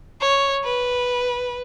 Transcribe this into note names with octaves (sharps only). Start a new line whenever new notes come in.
C#5
B4